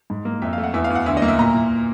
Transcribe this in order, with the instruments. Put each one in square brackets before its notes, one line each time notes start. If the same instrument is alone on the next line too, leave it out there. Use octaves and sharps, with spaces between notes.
[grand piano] G#2
A#3
F2 E5
F5
A3
F#5
E2 E5
F5
E2
F#5
D2 E5
D#5
A#3
E5
A#2 A#5
A#2